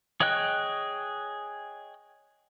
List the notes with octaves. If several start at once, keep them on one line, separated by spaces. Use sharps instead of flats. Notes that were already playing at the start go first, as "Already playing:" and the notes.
G#4 C#5 D#5 G5 F#6